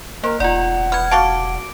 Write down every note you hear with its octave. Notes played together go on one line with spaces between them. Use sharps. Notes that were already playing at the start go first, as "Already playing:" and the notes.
A#3 C4 A#4
E1 D#4 F4 D5 F#5
B3 F6 G#6
F#4 F5 A5 D6 D7